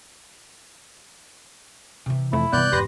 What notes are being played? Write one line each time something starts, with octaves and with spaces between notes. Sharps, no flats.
C3 E3
F2 A3 E4
G2 C3 E3 B3 D5 F#6 G6
G#1 E2 G4 B4 C6 A#6